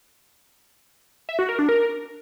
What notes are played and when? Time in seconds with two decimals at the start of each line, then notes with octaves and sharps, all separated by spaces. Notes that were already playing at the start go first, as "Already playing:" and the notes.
1.29 E5
1.39 F#4
1.49 A#4
1.59 D4
1.69 A#4